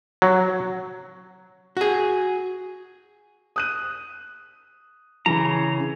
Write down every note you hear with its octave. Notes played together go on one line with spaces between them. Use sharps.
F#3
F#4 G#4
D#6 F#6 D#7
C#3 E3 A#5